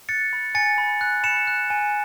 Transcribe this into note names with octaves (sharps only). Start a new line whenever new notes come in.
F#6 A6 C#7
B5
G#5 A6 C#7
B5
F#6
B5 C#7 E7
F#6
G#5